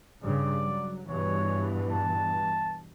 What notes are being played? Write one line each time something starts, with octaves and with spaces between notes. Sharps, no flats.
G2 C#3 D5
F#3
G2 B2 E3 C#5
A5